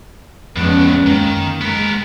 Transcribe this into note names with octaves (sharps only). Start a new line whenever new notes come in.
F2 A2 G#3 B3 C#4 D4
F#2 D#3 A#3 C#4
G#3 B3 A#4